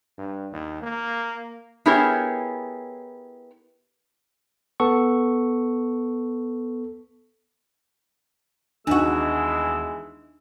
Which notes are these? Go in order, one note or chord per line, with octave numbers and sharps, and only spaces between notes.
G2
D#2
A#3
B3 E4 G4 G#4 A#4 C#5
B3 A4 C#6
D#2 B2 E3 G#3 D4 D#4 F#4 E6